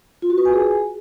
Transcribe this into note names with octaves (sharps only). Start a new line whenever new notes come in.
F4
F#4
B4
G#5
G#4